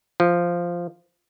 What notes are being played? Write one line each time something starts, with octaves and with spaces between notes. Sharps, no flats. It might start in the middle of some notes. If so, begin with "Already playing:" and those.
F3